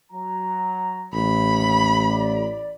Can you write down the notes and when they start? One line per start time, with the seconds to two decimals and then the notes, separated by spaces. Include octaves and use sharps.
0.12 F#3 A#5
1.14 A1 B5
1.54 D#2
2.09 D5